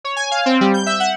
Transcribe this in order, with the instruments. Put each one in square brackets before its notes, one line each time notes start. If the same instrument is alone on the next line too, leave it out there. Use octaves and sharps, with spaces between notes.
[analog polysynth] C#5
G#5
F5
C4
G3
G6
E5
F#5